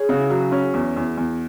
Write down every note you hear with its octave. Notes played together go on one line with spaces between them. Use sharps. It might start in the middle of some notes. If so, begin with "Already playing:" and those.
Already playing: G#4 B4 C#5
C#3 F#4
E4
F#3 F#4
C#4
E2
E2
E2